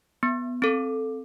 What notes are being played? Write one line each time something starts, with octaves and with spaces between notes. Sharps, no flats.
B3
C4 A4